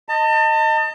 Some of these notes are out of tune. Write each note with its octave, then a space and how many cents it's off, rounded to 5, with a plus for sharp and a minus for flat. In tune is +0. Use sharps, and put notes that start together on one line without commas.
D#5 +0 A5 +35